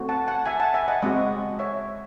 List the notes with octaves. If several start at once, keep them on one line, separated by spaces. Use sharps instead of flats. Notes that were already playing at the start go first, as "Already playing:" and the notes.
Already playing: A3 C4 F#4
F#5 A5
F#5 A5
E5 G#5
F#5 A5
E5 G#5
D#5 F#5
G#3 C4 F#4 D#5 F#5
C#5 E5